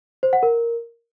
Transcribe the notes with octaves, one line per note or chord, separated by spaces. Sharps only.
C5
F#5
A#4